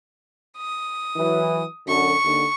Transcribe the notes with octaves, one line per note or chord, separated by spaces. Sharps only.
D#6
E3 F#3
F#2 D3 C#6
D#2 D3